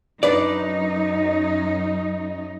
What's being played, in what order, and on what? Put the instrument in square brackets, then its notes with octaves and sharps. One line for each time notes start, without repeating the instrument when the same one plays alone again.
[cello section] F#2 D#4 [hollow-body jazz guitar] D4 B4 D5